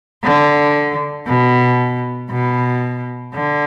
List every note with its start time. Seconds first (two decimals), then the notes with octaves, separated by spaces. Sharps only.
0.23 D3
1.27 B2
2.30 B2
3.34 D3